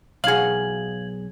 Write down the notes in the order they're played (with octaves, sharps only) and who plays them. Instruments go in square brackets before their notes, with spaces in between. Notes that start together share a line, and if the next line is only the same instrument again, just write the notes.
[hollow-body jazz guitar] B1 G#4 [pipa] F#4 F5 [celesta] G#6 F#7